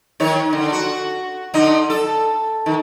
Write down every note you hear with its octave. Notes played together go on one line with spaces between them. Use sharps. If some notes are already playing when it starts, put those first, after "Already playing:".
D#3 C#5
D3
F#4
D3 D#4
A4
D#3